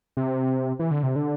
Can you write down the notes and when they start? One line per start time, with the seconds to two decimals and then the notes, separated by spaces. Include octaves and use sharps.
0.17 C3
0.79 E3
0.91 D3
1.03 C3
1.16 D3